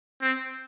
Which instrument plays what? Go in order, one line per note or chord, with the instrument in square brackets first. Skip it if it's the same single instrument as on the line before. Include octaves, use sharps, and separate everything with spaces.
[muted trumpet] C4